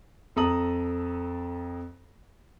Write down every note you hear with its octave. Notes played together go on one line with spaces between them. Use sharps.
F2 A4 A#5 D#6 F#7